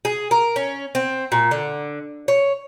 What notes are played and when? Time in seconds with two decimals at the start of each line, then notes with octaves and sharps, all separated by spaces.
0.05 G#4
0.31 A#4
0.56 C#4
0.95 C4
1.32 A#2
1.51 D3
2.28 C#5